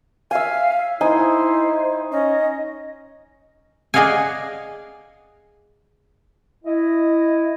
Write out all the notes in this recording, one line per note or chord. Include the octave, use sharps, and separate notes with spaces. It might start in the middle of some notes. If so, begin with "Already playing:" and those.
E5 F5 G#5
D#4 E4 C5 G#5
C#4 D#5
G#4 D5 D#5 F5 F#5 G#5
E4 D#5